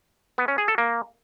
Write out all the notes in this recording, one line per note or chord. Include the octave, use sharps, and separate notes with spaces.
B3
C#4
G#4
A4
A#3